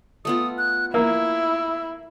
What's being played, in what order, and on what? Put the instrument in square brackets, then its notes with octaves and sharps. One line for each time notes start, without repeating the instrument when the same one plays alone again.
[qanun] A3 B3 F4 [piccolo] D#6
[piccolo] F#6
[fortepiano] A#3 [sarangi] E4 [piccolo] E6